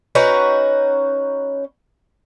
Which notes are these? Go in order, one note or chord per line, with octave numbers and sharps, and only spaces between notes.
C#4 D#4 F#4 B4